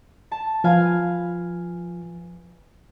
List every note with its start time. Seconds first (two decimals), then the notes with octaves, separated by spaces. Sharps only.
0.32 A5
0.64 F3 B4 F5 G#5